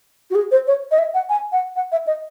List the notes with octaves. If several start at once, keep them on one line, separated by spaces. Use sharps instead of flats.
F#4
G#4
C5
C#5
D#5
E5
F#5
G#5
F#5
F#5
E5
D#5